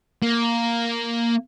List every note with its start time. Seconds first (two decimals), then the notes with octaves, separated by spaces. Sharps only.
0.22 A#3